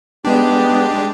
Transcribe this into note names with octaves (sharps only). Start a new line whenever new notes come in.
G#3 B3 D4 G4